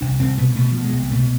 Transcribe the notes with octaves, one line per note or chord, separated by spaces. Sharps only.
C2 D4
C2 C4
B2 B3
B2 A3
B2 F3
G#3
C2
B2 A3